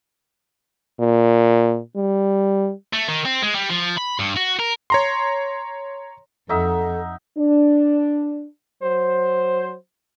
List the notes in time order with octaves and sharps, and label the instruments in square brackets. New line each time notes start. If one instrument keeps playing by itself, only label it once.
[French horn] A#2
G3
[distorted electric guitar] A3
D#3
C4
G#3
G3
F3
B5
G2
F#4
A#4
[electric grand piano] C#5 A#5 C6
[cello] F2 [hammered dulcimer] D#4 E5 F#5 [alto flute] A4
[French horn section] D4
[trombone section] F#3 C5